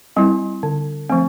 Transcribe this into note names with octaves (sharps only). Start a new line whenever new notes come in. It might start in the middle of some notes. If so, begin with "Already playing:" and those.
G3 C4 E4
D3
F3 A3 C4